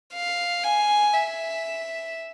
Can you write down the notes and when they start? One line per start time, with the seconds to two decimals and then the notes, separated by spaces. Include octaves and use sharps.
0.14 F5
0.63 G#5
1.13 E5